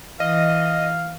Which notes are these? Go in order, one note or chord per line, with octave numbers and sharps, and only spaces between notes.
E3 D#5 F5